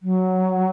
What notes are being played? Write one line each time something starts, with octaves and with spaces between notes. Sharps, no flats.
F#3